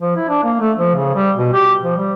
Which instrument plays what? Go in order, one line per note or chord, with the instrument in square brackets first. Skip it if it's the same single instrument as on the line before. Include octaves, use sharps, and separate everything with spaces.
[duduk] F3
E4
D4
A#3
A3
F3
C#3
G3
B2
G4
F3
G3